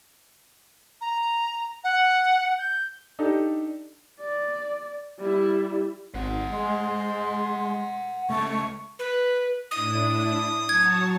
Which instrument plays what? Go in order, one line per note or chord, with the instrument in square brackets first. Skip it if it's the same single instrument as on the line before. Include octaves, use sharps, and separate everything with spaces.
[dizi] A#5
F#5
G6
[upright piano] D4 D#4 G4 A4
[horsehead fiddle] D5
G3 E4
[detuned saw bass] G#1 [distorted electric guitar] C5 F#5
[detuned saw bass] G#3 [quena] C6
[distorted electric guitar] C#2 A5 [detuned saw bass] A3 [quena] C#6
[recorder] B4
[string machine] A2 D4 E4 [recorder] D#6
[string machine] F#3 C#5 A5 [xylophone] G#6